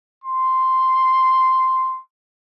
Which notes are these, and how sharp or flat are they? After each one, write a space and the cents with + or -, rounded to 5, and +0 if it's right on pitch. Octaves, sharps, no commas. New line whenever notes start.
C6 -5